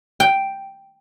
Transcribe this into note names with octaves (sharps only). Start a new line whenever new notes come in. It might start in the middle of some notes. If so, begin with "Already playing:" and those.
G5